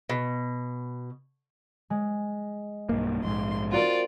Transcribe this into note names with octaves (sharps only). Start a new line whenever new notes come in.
B2
G#3
B1 G2 A#3
A#1 G#2 C6
C4 F4 F#4 A#4 D5